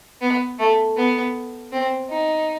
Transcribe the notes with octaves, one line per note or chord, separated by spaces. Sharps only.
B3
A3
B3
C4
D#4